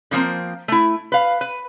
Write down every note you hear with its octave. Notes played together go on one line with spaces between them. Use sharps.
D3 F3 A3 A#3 C4
A3 E4
B4 F5
B4